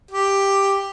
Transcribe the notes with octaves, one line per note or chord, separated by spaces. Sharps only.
G4